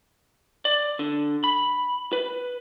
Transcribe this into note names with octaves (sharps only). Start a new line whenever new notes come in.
D5
D3
B5
B4